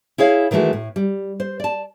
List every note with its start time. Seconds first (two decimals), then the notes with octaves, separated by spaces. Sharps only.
0.18 E4 G#4 C#5 F5
0.51 D#3 E3 G#3 A3 F#4
0.73 A2
0.96 G3
1.40 C5
1.60 D5 A5